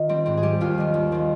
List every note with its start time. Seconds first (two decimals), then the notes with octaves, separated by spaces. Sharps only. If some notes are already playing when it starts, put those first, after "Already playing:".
Already playing: D#3 F4
0.09 G3 C4
0.26 G#2 C4
0.37 G#4
0.43 G3 G4
0.61 D#2 F4
0.78 D#3 G3
0.94 D#2
1.11 D#3 G3 C4